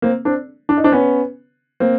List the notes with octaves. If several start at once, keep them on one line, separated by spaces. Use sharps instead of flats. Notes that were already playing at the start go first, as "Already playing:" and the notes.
A#3 C4
C4 D4
D4
D#4
C4 D4
B3 C#4
A#3 C4